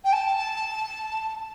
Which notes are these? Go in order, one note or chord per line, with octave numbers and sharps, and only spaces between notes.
G5
A5